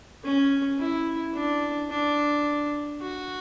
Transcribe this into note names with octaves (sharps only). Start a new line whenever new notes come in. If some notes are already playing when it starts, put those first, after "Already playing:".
C#4
E4
D4
D4
F#4